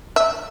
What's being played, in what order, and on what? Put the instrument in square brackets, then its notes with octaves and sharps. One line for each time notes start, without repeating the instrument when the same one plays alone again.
[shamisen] E5